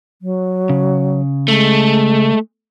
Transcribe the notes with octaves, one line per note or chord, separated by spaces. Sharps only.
F#3
C#3
G#3 A3